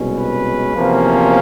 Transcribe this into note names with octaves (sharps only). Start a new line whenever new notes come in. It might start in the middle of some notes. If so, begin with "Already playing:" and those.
Already playing: C2 B2 G#3 C#4
B4
E2 C3 F3 A#3 C#4